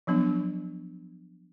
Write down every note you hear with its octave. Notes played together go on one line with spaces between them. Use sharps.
F3 F#3 B3 D4